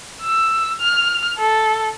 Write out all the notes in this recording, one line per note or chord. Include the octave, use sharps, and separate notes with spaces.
E6
F6
A4